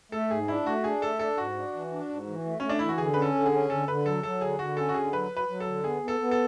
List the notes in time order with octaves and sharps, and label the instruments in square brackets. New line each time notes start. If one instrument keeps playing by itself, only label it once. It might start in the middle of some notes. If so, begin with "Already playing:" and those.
[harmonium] A3 [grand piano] A4
[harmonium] G#2 [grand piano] G#4
[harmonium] D4 [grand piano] E4
[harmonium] A3 [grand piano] F#4
[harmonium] D4 [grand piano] G#4
[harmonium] A3 [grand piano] A4
[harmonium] D4 [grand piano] A4
[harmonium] G#2 [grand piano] F#4
[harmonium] D4
E3
D4
G#2
E3
A3
[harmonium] A3 [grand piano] C#4
[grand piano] D4
[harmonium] E3 [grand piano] E4
[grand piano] F#4
[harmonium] D3 [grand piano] G#4
[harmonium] C#4 [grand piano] B4
[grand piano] A4
[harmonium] D3
[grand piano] G#4
[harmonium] C#4
[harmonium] D3 [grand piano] A4
[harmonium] D3 [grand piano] B4
[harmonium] F#3 [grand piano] A4
[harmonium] F#3 [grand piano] A4
[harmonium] D3 [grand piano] G#4
[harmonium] D3 [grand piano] F#4
[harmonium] C#4 [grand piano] A4
[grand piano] F#4
[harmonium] D3 [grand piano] G#4
[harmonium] F#3 [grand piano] B4
[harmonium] F#3
[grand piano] B4
[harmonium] F#3
[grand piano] A4
[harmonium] D3
[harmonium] B3 [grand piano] G#4
[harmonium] B3
[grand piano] A4
[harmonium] B3
[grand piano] A4